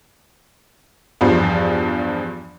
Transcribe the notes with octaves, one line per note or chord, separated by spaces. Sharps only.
E2 G2 F3